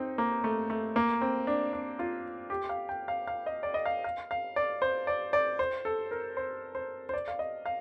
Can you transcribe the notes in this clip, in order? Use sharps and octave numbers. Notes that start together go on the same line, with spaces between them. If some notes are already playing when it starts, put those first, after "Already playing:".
Already playing: C4 D#4
A#3
A3
A3
A#3
C4
D4
D4
F4
G4
F5
G5
F5
F5
D#5
D5
D#5
F5
F5
F5
D5
C5
D5
D5
C5
A4
A#4
C5
C5
C5
D5
F5
D#5
F5